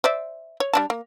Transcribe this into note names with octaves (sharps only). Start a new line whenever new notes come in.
C5 D5 E5
C#5
G3 D4 A5
A#3